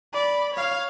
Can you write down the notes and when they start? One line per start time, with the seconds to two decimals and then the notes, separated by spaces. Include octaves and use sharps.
0.13 D5 B5
0.54 C#5 F5